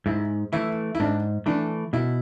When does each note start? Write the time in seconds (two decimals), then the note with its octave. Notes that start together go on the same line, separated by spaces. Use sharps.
0.06 G#2 E4
0.53 E3 A3 E4
0.95 E4
1.00 G#2 D4
1.46 E3 A3 D4
1.93 B2 E4